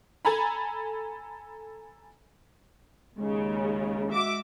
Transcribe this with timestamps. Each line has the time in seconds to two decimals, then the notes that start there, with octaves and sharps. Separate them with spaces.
0.25 A4 G#5 A#5 B5
3.17 D#2 C#3 G#3
4.12 F#4 E5 D6